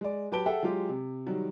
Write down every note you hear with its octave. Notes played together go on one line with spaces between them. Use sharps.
G#3 D5
F#3 G4 B4 A5 D7 G7
G#4 A4 E5 F#5 G5
F#3 G#3 F4 G4
C3
D#3 F#3 G3